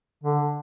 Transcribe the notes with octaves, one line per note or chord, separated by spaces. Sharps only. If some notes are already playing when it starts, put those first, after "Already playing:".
D3